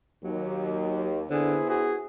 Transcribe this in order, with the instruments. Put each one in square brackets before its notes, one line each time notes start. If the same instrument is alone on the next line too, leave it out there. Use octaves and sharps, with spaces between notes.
[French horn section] D#2 [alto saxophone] F#3
[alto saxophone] D3 [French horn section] B3 E4 C5 [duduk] G#4
[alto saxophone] F#4 [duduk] G#4